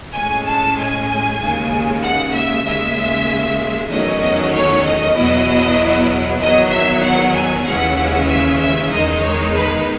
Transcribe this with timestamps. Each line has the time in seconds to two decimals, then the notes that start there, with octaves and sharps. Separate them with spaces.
0.15 A2 G#3 C#4 G#5
0.47 A5
0.78 G#5
1.40 D#2 C#3 G#3
2.03 F#5
2.34 E5
2.65 D#2 C#3 G#3 E5
3.90 E2 D#3 F#3 A3 C#4 D#5
4.54 C#5
4.85 D#5
5.16 E2 B2 F#3 B3 E4
6.41 E2 D#3 F#3 B3 D#5
6.72 E5
7.03 F#5
7.34 G#5
7.65 D#2 C#3 E3 G#3 C#4 F#5
8.29 E5
8.59 E5
8.91 E2 D#3 G#3 D#4 D#5
9.22 C#5
9.53 B4